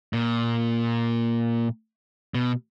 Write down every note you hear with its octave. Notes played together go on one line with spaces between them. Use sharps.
A#2
B2